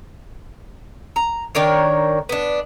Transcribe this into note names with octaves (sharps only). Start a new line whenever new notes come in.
A#5
D#3 D4 A#4 C#5
B3 D4